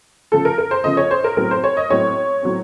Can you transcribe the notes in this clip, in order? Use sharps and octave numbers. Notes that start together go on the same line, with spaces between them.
C#3 F3 A3 A4
A#4
A#4
C5
C#3 F3 A3 D#5
C#5
C5
A#4
A2 F#3 C4 A#4
C5
C#5
D#5
A2 F#3 C4 C#5
A2 F#3 C4